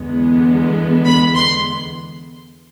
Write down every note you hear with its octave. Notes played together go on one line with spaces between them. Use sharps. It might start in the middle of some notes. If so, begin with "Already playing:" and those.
Already playing: E2 D3 G#3 B3
B5
C6